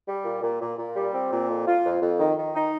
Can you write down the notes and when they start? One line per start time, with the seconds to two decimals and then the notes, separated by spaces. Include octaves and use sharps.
0.07 G3
0.25 A#2
0.42 A#2
0.61 A#2
0.78 A#2
0.96 G3
1.13 C4
1.31 A#2
1.48 F2
1.66 F4
1.84 F2
2.02 F2
2.19 D#3
2.37 D#3
2.55 D#4